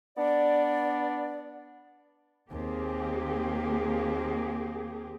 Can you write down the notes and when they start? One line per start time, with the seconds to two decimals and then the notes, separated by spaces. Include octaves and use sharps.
0.17 B3 D4 D5
2.51 D#2 A#3 C4 G4 G#4